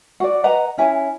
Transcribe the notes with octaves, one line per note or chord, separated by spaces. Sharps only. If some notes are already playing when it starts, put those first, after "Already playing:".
F#4 D5
B4 D#5 F#5 A#5
C#4 E4 G#5